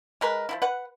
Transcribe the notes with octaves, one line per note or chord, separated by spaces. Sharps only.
G#3 A#4 B4
F3 F#3 E4
B4 F#5